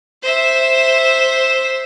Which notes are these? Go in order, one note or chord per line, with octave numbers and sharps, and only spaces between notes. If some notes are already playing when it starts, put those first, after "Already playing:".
C5 E5